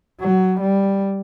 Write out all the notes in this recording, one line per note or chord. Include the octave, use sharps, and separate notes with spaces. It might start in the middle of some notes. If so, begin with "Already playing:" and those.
F#3
G3